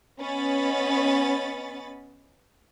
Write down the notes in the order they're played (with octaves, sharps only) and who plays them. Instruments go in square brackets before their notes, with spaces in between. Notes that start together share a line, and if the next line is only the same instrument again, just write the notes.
[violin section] B3 C#4 D#5 B5 A6